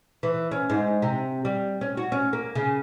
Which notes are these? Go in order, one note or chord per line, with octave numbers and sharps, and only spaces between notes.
E3
C#4
G#2
C3
G3
C#4
F#4
C#4
A#3
C#3